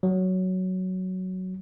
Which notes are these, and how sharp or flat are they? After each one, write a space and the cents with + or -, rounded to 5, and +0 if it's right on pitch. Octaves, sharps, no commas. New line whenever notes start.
F#3 +5